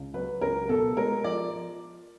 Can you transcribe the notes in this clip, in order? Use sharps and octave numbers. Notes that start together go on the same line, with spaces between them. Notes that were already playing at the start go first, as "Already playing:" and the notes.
Already playing: C#2
F#3 B4
C#2 A#4
B2 A4
G#3 A#4
F3 D5